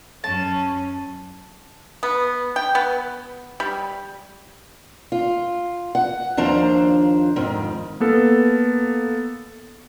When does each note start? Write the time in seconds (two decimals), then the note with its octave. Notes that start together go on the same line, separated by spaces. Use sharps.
0.24 F#2 C#4 A5
2.03 B3
2.56 G5
2.75 B3
3.60 G3
5.12 F4
5.95 F#5
6.37 D#2 F3 D4 C5 A#5
7.36 F2 G#2 D#3
8.00 A#3 B3 A4